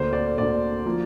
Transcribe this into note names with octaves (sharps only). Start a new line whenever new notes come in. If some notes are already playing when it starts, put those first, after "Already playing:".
Already playing: D2 D3 A#3 C5
D5
D2 D3 A#3 D5
F3 A#3